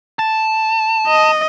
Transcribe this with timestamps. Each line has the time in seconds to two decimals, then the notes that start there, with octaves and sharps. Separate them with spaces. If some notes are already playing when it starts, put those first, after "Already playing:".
0.19 A5
1.07 D#5